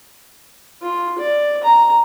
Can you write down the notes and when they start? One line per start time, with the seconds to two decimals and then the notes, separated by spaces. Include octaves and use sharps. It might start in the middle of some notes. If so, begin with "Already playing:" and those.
0.82 F4
1.18 D5
1.64 A#5